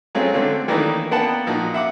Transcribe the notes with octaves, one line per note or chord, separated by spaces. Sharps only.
F#3 G#3 A3 C4 C#4 F4
D3 A3 C4 C#4
D#3 E3 A3 A#3 D4 D#4
A#3 B3 F#5 G5 A5
A#2 F3 D#4 F#4
E5 F#5 D6